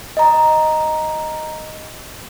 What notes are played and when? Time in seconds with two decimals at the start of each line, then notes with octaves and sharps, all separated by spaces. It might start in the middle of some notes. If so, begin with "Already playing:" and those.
0.17 D#5 A#5